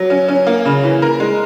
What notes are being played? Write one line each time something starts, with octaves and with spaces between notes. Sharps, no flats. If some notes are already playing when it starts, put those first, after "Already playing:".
Already playing: F#3
C#4
C#4
A#3
C#3
E3
A#4
G#3